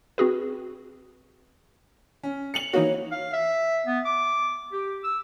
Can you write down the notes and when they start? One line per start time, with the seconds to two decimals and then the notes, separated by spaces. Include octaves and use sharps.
0.18 C4 F#4 G#4 B4
2.23 C#4
2.54 C#7 F7 F#7
2.73 E3 A#3 D#4 F#4 C#5
3.12 F5
3.33 E5
3.86 B3
4.05 D6
4.72 G4
5.04 E6